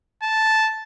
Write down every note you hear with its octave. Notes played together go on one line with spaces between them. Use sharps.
A5